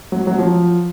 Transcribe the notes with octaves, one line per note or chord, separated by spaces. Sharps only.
F#3
F#3
F3